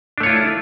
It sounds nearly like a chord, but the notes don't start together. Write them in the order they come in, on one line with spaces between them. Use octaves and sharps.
D4 A3 C#5 F4 E4